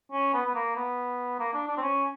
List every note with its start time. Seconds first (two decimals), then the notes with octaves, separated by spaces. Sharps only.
0.12 C#4
0.34 B3
0.45 B3
0.55 A#3
0.76 B3
1.40 A#3
1.54 D4
1.67 D4
1.77 C4
1.82 C#4